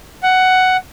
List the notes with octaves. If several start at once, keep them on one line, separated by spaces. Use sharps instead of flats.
F#5